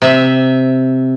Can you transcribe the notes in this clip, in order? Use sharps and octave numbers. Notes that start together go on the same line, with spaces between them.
C3 E5